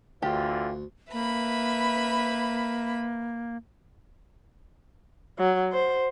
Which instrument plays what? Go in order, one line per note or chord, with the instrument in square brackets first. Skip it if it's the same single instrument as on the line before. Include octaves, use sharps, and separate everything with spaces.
[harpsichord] D2 [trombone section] D3 E3 F4 [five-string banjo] G4
[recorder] A#3 [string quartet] B4 E5 B5
[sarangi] F#3
C5